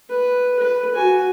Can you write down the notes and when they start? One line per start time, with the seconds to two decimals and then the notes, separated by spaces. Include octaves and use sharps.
0.10 B4
0.60 B4
0.95 F#4 G#5